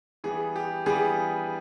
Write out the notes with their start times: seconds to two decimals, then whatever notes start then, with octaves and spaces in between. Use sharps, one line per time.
0.24 E3 G3 B3 G#4
0.56 G4
0.86 E3 G3 B3 G#4